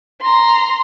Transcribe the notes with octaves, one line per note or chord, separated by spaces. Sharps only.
A#5 C6